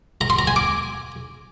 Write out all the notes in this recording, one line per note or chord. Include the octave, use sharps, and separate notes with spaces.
A#5
C6
A#5
G#5
D6